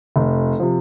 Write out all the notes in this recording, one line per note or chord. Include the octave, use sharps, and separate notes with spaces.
F1
C3 F3